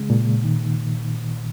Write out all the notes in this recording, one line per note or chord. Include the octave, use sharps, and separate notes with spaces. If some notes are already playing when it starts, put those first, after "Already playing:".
Already playing: C#3 G#3
A#2
D#3